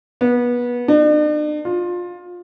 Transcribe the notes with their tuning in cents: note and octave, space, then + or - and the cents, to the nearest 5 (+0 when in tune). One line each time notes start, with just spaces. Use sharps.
B3 -25
D4 +45
F4 +20